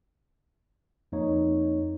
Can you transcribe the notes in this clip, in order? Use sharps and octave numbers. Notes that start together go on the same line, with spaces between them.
F2 A#3 D#4 C#5